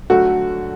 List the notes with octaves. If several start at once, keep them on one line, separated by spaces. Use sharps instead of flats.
D3 F#3 A3 F#4